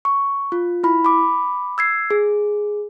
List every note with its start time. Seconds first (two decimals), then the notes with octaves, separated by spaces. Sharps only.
0.05 C#6
0.52 F4
0.84 E4 B5
1.05 B5 D6
1.78 E6 G#6 C7
2.11 G#4